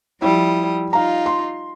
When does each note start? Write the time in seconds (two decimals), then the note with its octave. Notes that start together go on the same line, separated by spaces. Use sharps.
0.22 F3 G3 E4 D#6
0.93 D#4 F4 F5 A#5
1.26 C6